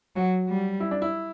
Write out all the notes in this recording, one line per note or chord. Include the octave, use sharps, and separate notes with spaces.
F#3 F#4
G3
E4
D4
E4